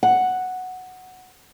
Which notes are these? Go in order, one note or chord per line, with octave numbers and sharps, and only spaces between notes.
F#5